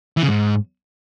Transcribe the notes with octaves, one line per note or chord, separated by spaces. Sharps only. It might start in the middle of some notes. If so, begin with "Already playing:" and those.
E3
C#3
G#2